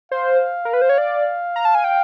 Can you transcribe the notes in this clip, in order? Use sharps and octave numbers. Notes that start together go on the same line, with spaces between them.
C5 F5
A#4
B4
C5
C#5
D5
A#5
A5
G#5
G5